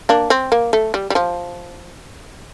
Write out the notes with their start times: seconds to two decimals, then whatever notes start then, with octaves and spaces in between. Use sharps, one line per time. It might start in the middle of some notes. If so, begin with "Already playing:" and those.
0.09 A#3 D4
0.30 C4
0.52 A#3
0.73 A3
0.94 G3
1.10 G3
1.15 F3